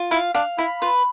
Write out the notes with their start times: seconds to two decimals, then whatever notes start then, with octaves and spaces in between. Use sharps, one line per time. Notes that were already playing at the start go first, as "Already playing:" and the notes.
Already playing: F4
0.11 E4 F5
0.35 D4 F5
0.58 E4 B5
0.82 F4 B4